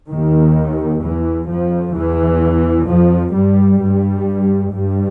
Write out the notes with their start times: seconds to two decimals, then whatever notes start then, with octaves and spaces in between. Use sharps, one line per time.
0.10 D#2 D#3
1.03 E2 E3
1.49 F2 F3
1.95 E2 E3
2.88 F2 F3
3.34 G2 G3
3.80 G2 G3
4.73 G2 G3